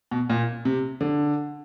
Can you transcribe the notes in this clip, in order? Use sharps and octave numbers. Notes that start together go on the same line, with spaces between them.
B2
A#2
C3
D3